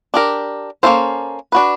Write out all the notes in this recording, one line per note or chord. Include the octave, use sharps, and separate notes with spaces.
D4 G4 A#4
A#3 C#4 F4 A4 C5
D4 F#4 B4